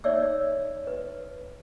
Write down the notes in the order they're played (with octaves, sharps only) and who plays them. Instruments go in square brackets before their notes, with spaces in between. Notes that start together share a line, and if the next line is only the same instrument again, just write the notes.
[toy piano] D#4 C#5 D5 E5 E6
B4